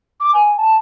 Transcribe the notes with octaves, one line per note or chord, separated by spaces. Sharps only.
D6
G#5
A5